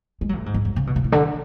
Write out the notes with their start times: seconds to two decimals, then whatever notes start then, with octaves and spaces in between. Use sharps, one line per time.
0.21 G#3
0.29 F#3
0.38 A2
0.46 G#2
0.54 F#2
0.65 F#2
0.76 C#3
0.87 B2
0.96 C#3
1.04 A2
1.12 D3